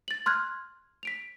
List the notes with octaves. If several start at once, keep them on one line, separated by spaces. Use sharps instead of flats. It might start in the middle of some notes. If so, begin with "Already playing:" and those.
A6 F#7
C6 F6 F#6 G#6
B6 D7 F7